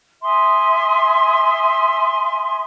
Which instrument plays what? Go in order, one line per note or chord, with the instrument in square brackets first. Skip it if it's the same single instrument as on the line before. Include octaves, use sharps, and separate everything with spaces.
[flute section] E5 G#5 C6 D#6